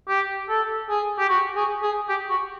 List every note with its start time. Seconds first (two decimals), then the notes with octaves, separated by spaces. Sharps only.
0.09 G4
0.49 A4
0.90 G#4
1.19 G4
1.29 F#4
1.56 G#4
1.83 G#4
2.09 G4
2.30 F#4